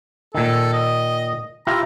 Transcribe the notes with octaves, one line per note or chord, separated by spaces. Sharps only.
A#2 D#3 A4
D#5
E4 F4 G4 A#5